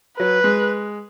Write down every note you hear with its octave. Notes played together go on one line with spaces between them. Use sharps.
F#3 B4
G#3